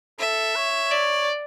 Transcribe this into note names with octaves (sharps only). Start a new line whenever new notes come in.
A4 E5
C#5
D5